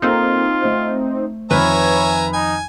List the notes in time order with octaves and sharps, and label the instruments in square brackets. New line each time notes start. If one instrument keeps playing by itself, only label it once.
[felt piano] A#3 A4 A#5 [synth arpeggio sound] C4 D#4 [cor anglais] F4
[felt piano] A3 C5
[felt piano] F2 D#3 F6 [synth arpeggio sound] B4 [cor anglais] C#5 [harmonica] E5 G#5 A#5
[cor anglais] D#4 [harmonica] G#5